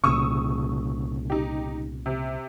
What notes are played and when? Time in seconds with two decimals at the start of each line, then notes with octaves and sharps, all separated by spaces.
0.04 C2 A#2 C#3 C#6 D#6 E6
1.30 D#4 G4
2.06 C3